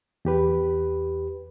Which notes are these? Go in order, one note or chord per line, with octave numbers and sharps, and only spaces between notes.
E2 G4 B4